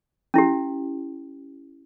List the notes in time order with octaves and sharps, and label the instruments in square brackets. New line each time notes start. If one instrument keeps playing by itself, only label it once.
[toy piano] C#4 E4 G4